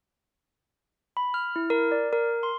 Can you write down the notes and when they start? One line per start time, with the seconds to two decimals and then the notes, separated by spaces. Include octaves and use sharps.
1.17 B5
1.34 F6
1.56 E4
1.70 A#4
1.92 D5
2.13 A#4
2.43 C6